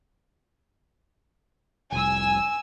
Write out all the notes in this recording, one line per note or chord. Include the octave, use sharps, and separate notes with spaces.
F1 C2 G#5 E6